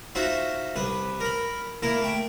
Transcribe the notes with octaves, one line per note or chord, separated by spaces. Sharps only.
D#4 F4 F#4 C5 E5
C2 B4 D#6
A#4 B5
A#3 E4 A#4
A3 G5